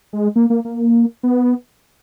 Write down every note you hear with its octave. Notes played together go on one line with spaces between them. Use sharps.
G#3
A#3
A#3
A#3
B3